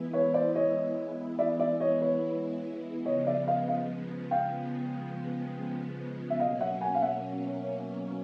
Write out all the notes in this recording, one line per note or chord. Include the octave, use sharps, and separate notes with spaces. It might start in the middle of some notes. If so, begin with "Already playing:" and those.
Already playing: E3 G#3 B3 E4
B4 C#5
C5 D5
C#5 D#5
D5 E5
D5 E5
C#5 D#5
B4 C#5
C#3 F3 G#3 B3 C#5 D#5
D5 E5
D#5 F5
D#5 F5
F5 G5
E5
B2 F#3 A#3 C#4 D#5 F5
E5 F#5
F#5 G#5
F5
E5 F#5